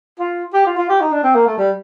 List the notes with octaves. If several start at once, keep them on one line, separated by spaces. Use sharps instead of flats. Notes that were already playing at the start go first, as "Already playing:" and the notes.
F4
G4
F4
F4
G4
D#4
D4
C4
A#3
A3
G3